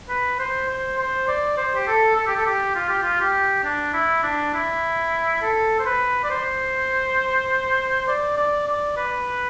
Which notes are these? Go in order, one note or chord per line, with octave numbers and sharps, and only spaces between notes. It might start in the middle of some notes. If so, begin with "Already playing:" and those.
B4
C5
C5
C5
D5
C5
G4
A4
A4
G4
A4
G4
F4
G4
F4
G4
D4
E4
D4
E4
A4
C5
B4
D5
C5
D5
D5
D5
B4